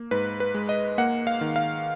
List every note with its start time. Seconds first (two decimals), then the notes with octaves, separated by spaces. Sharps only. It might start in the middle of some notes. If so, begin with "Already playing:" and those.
Already playing: A#3
0.11 G#2 B4
0.40 B4
0.54 G#3
0.69 D#5
0.98 A#3 F#5
1.27 F5
1.41 D#3
1.56 F5